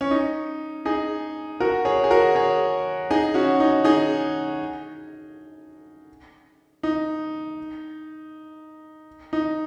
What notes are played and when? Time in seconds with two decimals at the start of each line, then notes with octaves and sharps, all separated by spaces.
0.01 C#4
0.11 D#4
0.85 D#4 G#4
1.60 F#4 A#4
1.85 G#4 C#5
2.04 G#4
2.11 F#4 A#4
2.35 G#4 C#5
3.11 D#4 G#4
3.34 C#4 F#4
3.60 D#4
3.84 D#4 G#4
6.83 D#4
9.33 D#4